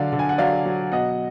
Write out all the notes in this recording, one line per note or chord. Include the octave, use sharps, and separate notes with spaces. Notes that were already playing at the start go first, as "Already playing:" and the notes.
Already playing: D3 F#3 D5 F5
D3
G#5
F#5
F#3 D5 F5
F#3
B2 D#5 F#5